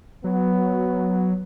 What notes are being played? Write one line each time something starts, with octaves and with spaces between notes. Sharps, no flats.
F#3 B3